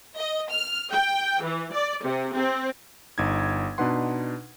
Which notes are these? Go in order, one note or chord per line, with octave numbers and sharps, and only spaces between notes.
D#5
F6
G5
E3
D5
C3
C4
G1 D#4 G#6
B2 D4 D#4 B4 F#5 C6